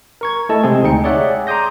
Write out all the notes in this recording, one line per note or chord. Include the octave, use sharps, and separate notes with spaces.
A#4 C#6 G#6
A3 E4 A4 D#5 A5
C3 G#3 C4 G#4
D2 G#3 D#4 G5 C#7
G#4 C#5 D5 E5 F#5
A#5 C6 D6 D#6 G6 A#6